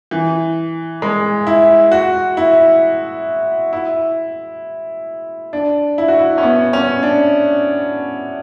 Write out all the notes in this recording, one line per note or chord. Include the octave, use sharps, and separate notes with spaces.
E3
G#3
E4
F#4
E4
E4
D4
E4
F#4
E4
C#4
B3
C#4
D4